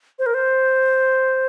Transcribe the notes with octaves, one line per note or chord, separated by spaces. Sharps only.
C5
A#4
C5